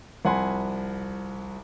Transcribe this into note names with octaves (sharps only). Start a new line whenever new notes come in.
C2 F3 F#5 G#5 B5 C6